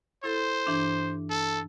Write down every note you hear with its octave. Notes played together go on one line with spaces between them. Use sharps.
E4 A4 C5 C6
G2 E3 D4
A4